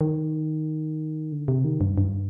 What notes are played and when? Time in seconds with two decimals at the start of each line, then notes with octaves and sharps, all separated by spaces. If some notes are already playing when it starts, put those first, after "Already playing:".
0.01 D#3
1.32 D3
1.48 C3
1.64 D#3
1.81 G2
1.98 G2